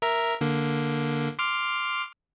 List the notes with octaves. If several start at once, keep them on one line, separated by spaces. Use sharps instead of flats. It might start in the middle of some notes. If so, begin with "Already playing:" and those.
A#4 E5 A#5
D3 A#3
C6 D6 F6